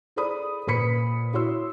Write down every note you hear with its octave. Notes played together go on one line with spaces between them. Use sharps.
G#4 A4 C5 D5 B5 D#6
A#2 B4 C5 B5 B6 C#7
E4 F#4 C#5 C6 E6